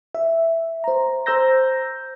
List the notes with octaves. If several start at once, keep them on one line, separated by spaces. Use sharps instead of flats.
E5
C5 A#5
C5 A#5 E6 G6 A#6